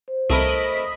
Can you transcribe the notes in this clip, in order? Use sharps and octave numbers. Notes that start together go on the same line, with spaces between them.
C5
C2 A3 E4 A#4 D#5 B5